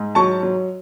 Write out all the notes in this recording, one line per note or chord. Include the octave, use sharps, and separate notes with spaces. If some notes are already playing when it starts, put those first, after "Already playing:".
Already playing: G#2
F#3 A5 C#6
F#3